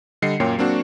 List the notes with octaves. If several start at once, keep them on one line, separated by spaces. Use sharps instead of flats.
D3 G3 D#5 C7 C#7
F#2 A#2 A#3 C#5 G5 C7
F#3 A#3 C4 D4 F#4